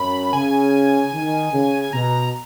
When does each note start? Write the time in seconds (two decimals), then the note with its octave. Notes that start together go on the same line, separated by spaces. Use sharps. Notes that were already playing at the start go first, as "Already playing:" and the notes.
Already playing: F#2 B5
0.33 C#3 G#5
1.14 D#3
1.53 C#3
1.93 B2 A#5